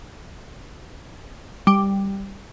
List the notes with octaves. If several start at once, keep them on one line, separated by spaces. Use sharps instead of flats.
G3